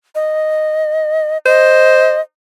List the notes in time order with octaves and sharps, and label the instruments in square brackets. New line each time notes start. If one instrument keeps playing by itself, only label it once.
[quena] D#5
[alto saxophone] C5 [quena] D#5